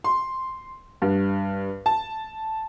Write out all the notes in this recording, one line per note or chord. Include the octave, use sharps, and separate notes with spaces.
C6
G2
A5